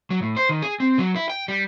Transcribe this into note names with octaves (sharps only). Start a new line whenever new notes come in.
F#3
A2
C5
D#3
G#4
C4
F#3
E4
G5
G3